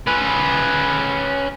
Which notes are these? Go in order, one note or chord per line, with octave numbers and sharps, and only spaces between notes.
C#4 B4